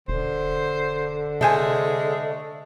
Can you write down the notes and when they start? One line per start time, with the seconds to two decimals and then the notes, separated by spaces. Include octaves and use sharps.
0.08 E1 D3 C5
1.41 C3 G#3 A3 C5 G#5